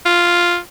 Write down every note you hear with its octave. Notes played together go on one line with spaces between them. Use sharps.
F4